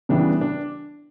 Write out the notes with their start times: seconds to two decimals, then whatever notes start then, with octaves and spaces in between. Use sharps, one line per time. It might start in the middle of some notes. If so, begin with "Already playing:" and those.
0.09 C#3 E3 G3 B3 D4
0.41 D4